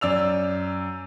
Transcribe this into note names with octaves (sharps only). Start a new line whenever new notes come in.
F#2 D5 E6 F7